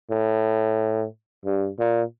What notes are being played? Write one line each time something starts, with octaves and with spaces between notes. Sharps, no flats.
A2
G2
A#2